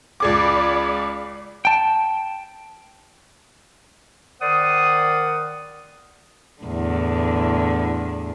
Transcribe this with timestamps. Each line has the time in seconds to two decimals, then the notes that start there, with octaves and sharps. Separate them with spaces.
0.20 C#2 G#3 G#4 D5 B5 D6
1.65 G5 A5
4.42 D#3 A#4 C5 D5 F#5 D#6
6.62 E2 A2 D3